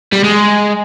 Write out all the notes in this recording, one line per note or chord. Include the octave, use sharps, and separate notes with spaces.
G3
G#3